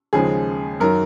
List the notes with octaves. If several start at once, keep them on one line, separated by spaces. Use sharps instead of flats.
D#2 C#3 F3 G#3 G#4
F#2 D#3 F#3 A#4